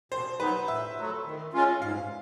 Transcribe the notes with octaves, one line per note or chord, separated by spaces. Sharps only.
B2 C5
F#3 B3 D#4 B4
A2 E5
F#3 A3
D#3
G#3 C#4 F4
G#2 F5